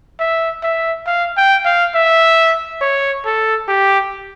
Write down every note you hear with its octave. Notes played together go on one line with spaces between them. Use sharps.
E5
E5
F5
G5
F5
E5
C#5
A4
G4